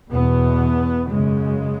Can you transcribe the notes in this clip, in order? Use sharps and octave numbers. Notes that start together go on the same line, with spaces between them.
E2 B2 B3
F#2 C#3 G#3